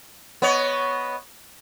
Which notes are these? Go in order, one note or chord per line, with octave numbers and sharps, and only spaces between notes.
B3 C#5 D#5